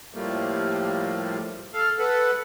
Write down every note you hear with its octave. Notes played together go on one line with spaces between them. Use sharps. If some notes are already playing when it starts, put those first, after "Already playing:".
A2 F3 G3 A3 A#3
A4 F5
A4 B4 F#5